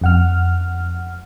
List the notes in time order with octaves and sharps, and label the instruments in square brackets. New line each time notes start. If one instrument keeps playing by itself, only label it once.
[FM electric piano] F2 F#5 F6